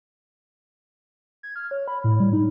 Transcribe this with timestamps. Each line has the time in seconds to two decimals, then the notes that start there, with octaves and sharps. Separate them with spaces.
1.43 G#6
1.56 F6
1.71 C#5
1.88 B5
2.04 A2
2.20 G3
2.33 D#4